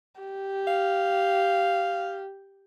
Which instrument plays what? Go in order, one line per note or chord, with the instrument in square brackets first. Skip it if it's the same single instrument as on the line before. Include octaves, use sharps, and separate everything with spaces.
[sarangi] G4
[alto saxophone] F5